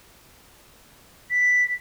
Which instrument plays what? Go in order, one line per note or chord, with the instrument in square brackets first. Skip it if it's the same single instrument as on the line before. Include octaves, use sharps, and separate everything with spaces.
[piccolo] B6